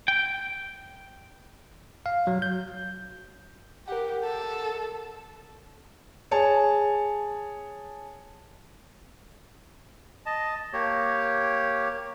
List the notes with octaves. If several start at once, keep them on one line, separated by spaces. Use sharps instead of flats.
G5
F5
F#3
G6
G4 A#4 F#5
A4
G#4 C#5 A5
D#5 A5
A#3 G4 C#5